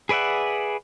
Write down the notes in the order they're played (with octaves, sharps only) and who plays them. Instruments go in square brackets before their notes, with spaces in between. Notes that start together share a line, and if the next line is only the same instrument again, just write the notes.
[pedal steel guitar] G#4 B4 D5 E5 F#5